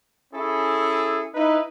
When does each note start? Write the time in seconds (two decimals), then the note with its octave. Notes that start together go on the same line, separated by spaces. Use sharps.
0.34 C#4 E4 G#4 A4
1.34 D#4 E4 B4